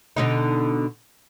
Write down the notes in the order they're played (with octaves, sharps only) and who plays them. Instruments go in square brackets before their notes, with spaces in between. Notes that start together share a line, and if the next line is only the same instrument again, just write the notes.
[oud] B2 D3 D#4